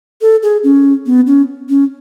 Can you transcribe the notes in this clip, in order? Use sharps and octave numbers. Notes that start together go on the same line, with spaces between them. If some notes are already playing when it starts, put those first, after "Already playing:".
A4
G#4
C#4
B3
C#4
C#4